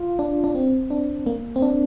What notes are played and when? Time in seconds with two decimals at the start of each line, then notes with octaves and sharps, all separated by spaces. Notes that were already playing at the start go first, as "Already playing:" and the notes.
Already playing: F4
0.19 D4
0.44 D4
0.55 C4
0.90 D4
1.26 A#3
1.56 C4
1.62 D4